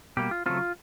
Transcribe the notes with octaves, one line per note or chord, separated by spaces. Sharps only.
B2 G3 A#3 G4
F4
C#3 F#3 A3 C4 F4